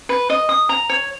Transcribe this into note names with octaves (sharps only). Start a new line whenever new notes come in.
B4
D#5
D#6
A#5
C#5